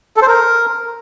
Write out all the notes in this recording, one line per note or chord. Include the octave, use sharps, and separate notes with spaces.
A4
C5
A#4